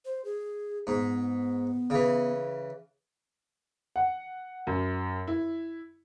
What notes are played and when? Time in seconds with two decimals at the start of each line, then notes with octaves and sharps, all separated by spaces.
0.05 C5
0.25 G#4
0.87 G#2 B3
1.90 C#3 E3
3.96 F#5
4.67 F#2
5.28 E4